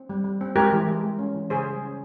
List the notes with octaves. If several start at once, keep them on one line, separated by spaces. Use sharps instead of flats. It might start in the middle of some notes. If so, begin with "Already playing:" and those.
Already playing: C4
G3
G3
C4
G#3 G4 A#4
E3
G#3
G#3
C#4
E3
C#3 G#4 C5
G3
C#4